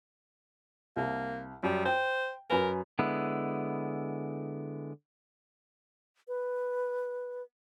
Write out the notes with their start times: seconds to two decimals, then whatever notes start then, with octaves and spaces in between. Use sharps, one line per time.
0.96 C2 A#3
1.63 F#2 G3
1.85 C5 G5
2.50 F#2 A#4 B4 G#5
2.99 D3 G#3 B3 E4
6.28 B4